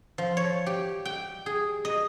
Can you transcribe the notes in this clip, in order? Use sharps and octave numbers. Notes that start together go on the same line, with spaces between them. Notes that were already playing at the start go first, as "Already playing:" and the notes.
F3
C#5
G4
G5
G#4
D#5